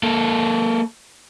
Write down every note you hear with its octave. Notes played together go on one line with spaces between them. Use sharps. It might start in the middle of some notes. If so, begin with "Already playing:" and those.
A#3 A4